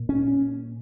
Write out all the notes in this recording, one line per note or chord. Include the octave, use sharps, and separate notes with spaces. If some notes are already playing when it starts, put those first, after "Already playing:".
Already playing: A#2
C#4